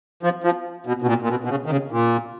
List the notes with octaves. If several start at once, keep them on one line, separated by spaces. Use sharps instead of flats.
F3
F3
B2
B2
A#2
A#2
B2
B2
C#3
D#3
C#3
A#2